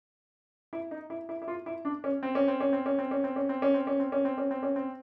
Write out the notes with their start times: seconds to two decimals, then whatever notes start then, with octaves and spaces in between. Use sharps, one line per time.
0.73 E4
0.91 D#4
1.10 E4
1.29 E4
1.42 E4
1.48 F4
1.66 E4
1.85 D4
2.04 C#4
2.23 C4
2.35 C#4
2.48 C4
2.60 C#4
2.73 C4
2.86 C#4
2.99 C4
3.11 C#4
3.24 C4
3.36 C#4
3.49 C4
3.62 C#4
3.74 C4
3.87 C#4
4.00 C4
4.12 C#4
4.25 C4
4.38 C#4
4.51 C4
4.63 C#4
4.76 C4